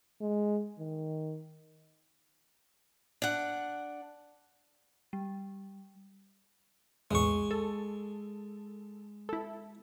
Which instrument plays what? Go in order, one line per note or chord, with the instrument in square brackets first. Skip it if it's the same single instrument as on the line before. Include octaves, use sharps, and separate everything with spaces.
[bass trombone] G#3
D#3
[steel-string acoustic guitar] D4 F#5
[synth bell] G3
[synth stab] B1 E2 A2 [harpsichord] G#3 C#6
[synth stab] A4
E4 A4